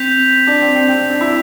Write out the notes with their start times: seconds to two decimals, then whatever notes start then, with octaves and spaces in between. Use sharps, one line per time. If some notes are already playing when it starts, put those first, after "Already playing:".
Already playing: C4 G6 B6 F7
0.47 D4
0.62 C4
0.75 C4
0.89 C4
1.10 D4
1.21 E4